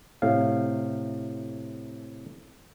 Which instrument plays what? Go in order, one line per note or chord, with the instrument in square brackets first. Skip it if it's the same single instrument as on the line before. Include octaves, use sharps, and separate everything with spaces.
[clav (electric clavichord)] A2 C3 F5